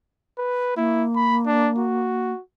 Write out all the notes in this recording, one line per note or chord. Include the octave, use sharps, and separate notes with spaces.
B4
A#3 E4
B5
D4
F#4